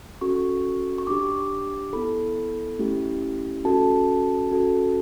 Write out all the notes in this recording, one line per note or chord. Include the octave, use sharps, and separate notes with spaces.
C#4 F#4 A4 C#6
C#6
D4 G4 D6
B3 E4 A4 B5
A3 C#4 E4 G4
C#4 F#4 A4 A5
C#4 F#4 A4